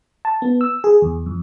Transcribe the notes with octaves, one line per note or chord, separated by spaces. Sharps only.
A5
B3
E6
G#4
E2
F2